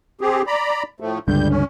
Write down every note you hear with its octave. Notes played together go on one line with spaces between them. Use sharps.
C4 G4 G#4
D5 A#5 B5
A2 F3 A3
C#2 G2 D3 G3 G6
C#4